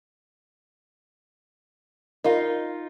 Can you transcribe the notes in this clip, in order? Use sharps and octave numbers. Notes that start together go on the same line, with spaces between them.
D#4 F4 A#4